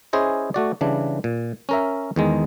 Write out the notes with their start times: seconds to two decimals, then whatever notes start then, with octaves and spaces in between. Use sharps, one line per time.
0.13 C#4 E4 G#4 C5 D#5
0.54 A3 F#4 D5
0.81 C#3 E3 G3 D4
1.24 A#2
1.69 C#4 A#4 E5
2.16 E2 D#3 G#3